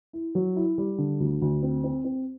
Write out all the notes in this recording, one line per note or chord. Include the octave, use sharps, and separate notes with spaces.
E4
F#3
E4
G3
D3
D2
D2
C4
C4
C4